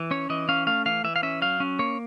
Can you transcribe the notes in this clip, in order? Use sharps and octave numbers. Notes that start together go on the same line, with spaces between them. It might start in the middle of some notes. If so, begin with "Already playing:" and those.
Already playing: E3
C#4 C#5
E3 D#5
C#4 F5
A3 F5
E3 F5
E3 E5
F5
C#4 E5
F#3 F5
C#4
A#3 C#5